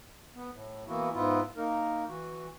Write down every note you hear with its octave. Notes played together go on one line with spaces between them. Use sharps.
B3
A2
E3 A#3 B3 E4 F#4
G#2 B3 E4 F4
A#3 D#4 A#4
E3 F#4